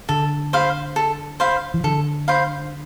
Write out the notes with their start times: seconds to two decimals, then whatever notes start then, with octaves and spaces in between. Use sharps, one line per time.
0.09 D3 A4
0.53 C5 F5 B5
0.96 A4
1.40 C5 F5 B5
1.74 E3
1.84 D3 A4
2.28 C5 F5 B5